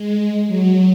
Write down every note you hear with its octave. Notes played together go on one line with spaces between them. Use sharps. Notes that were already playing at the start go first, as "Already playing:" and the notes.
Already playing: G#3
F#3